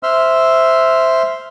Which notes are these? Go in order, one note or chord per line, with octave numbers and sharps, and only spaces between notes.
C5 E5 C6 E6 F6